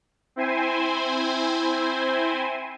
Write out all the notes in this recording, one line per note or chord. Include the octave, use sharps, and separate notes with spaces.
C4 E4 C5 G#5